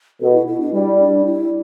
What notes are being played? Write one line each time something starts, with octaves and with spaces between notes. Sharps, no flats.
B2 A4
G4
E4
E4
D4
G3 E4
D4
E4